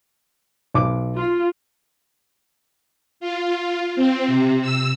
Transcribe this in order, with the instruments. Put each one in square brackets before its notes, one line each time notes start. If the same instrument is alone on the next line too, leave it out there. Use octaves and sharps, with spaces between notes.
[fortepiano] B1 D6
[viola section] F4
[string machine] F4
C4
C3
E6